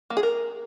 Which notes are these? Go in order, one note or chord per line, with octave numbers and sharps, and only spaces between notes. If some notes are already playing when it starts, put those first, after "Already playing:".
A#3
G#4
A#4